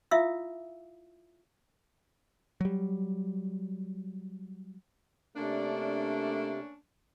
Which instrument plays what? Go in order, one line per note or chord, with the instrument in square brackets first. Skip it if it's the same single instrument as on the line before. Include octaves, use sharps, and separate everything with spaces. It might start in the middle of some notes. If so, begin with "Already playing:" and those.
[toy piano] E4 F4 E5 F5 D#6 E6
[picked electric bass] F#3 G3
[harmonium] C3 [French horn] A3 [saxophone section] A#3 C#4 D4